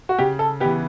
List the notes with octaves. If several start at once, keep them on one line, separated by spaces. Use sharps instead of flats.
F#4
C#3 G4
A4
E3 B3 G4